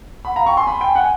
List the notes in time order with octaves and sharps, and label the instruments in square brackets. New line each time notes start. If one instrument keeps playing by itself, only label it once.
[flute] F#5 [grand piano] B5
[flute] F5 [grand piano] A#5
[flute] G5 [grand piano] C#6
[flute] G#5 [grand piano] C6
[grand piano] B5
G5
F#5